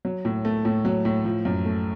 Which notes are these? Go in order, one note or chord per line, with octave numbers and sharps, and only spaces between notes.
F#3
A2
A3
A2
F#3
A2
F3
F#2
A3